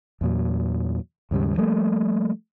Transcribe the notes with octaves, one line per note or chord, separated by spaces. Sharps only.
E2 A#2 F#3
D#2 G#2 C#3 G3
F3 G3 A3 A#3